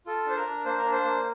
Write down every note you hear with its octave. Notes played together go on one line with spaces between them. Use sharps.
F4 A4
D4 C5
A#4
D4
A#3 C5
A#4
D4
C5
A#3